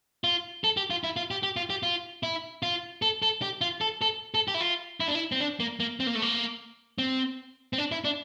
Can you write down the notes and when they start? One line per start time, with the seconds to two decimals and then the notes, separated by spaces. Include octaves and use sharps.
0.24 F4
0.64 A4
0.77 G4
0.90 F4
1.04 E4
1.16 F4
1.31 G4
1.43 G4
1.56 F4
1.70 G4
1.83 F4
2.23 E4
2.63 F4
3.02 A4
3.22 A4
3.42 G4
3.61 F4
3.81 A4
4.01 A4
4.34 A4
4.48 G4
4.54 E4
4.61 F4
5.00 E4
5.08 D4
5.15 E4
5.32 C4
5.40 D4
5.60 A#3
5.80 A#3
6.00 C4
6.07 A#3
6.15 A3
6.22 A#3
6.98 C4
7.73 C4
7.78 D4
7.92 E4
8.04 D4